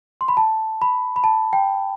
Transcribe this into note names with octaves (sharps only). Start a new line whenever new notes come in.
C6
B5
A5
B5
B5
A5
G5